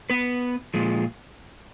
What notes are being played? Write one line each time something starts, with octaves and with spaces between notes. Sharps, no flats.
B3 B4
A#2 F3 G#3